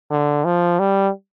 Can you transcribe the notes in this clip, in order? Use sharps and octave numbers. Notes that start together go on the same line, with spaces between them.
D3
F3
G3